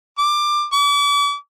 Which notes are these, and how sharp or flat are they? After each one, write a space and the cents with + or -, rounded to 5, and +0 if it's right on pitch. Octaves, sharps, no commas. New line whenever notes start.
D6 +20
D6 -40